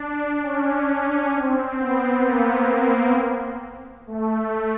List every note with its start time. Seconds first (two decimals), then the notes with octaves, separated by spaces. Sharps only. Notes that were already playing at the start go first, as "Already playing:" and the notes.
Already playing: D4
0.42 C#4
0.88 C#4
1.34 C4
1.79 B3
2.25 A#3
4.07 A3